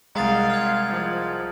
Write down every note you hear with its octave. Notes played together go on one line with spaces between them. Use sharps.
C2 G#3 F5 A#5 D#6 A6
F6 G#6
F3